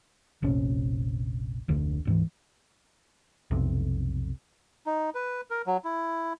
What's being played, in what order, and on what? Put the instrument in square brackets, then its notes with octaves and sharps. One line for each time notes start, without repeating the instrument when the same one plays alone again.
[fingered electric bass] F1 A#1 C3 C#4
F1 D2 D3
D1 G#2 E3
[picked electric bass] B1 F2 C3
[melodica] D#4
B4
A#4
F#3
E4